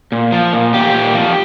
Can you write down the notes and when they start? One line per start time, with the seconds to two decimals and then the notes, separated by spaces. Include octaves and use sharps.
0.12 A#2
0.32 F3
0.53 A#2
0.74 A#2 G4
0.94 A#2
1.15 F3